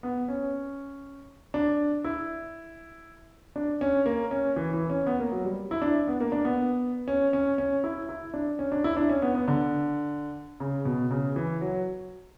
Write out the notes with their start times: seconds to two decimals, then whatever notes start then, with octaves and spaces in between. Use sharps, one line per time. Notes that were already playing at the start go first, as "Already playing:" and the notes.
0.03 B3
0.28 C#4
1.54 D4
2.04 E4
3.56 D4
3.81 C#4
4.06 A#3
4.31 C#4
4.56 E3
4.73 E3
4.90 C#4
5.07 B3
5.20 A#3
5.32 F#3
5.45 G3
5.71 E4
5.82 D4
6.07 B3
6.20 A#3
6.32 D4
6.45 B3
7.08 C#4
7.33 C#4
7.58 C#4
7.84 E4
8.09 E4
8.34 D4
8.59 C#4
8.72 D4
8.84 E4
8.97 D4
9.09 C#4
9.22 B3
9.35 B3
9.48 D3
10.60 C#3
10.85 B2
11.11 C#3
11.36 E3
11.61 F#3